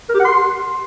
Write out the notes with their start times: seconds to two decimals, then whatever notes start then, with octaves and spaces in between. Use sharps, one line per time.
0.09 A#4
0.14 G4
0.19 F#5
0.25 C6